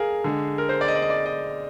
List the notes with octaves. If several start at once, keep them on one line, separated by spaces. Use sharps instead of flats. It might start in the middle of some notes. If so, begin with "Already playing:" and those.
Already playing: G#3 G#4 A#4 F5
D3 G#3
A#4
C5
D5
D#5
D5
D#5
D5
D#5